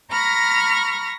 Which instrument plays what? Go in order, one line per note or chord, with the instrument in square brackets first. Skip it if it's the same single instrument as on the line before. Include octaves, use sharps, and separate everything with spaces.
[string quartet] A#5 B5 C#6 F6 A#6